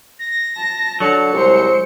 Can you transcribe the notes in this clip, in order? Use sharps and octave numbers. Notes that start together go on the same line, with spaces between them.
A#6
A5
D3 F#3 C#7
C2 G#3 C5